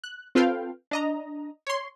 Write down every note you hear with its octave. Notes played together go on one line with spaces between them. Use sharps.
F#6
C4 F4 A4 B4 F5 G5
D4 D#5 A#5
C#5 C6